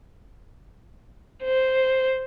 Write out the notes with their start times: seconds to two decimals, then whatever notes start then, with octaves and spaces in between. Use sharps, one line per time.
1.45 C5